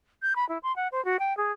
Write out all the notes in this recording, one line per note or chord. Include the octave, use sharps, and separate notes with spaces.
G6
B5
E4
C6
F#5
C5
F#4
G5
G#4